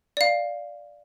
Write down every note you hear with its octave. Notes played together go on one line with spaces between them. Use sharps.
D5 F5